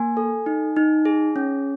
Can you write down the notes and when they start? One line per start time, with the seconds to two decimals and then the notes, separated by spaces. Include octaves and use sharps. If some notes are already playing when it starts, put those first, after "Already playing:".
Already playing: A#3 G#5
0.17 A4
0.46 D#4
0.76 D#4
1.05 G#4
1.36 C#4